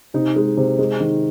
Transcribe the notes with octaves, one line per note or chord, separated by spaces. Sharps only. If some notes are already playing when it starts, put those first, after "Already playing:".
C3 D#4
G#3
C3
G#3
D#3